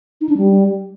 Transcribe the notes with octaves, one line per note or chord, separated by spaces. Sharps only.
D#4
D4
G3